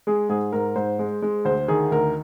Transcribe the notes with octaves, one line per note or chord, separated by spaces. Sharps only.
G#3 G#4
G#2 G#4
G#2 A#4
G#2 C5
G#3
G#3
D2 C5
D#3 G#4
D2 A#4